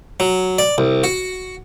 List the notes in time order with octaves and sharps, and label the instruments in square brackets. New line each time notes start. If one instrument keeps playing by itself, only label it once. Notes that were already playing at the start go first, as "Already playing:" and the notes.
[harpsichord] F#3
D5
C2
F#4